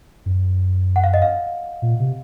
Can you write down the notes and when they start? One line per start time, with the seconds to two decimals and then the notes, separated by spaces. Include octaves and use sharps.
0.26 F#2
0.96 F#5
1.04 F5
1.14 D#5
1.22 F5
1.82 A#2
2.00 C3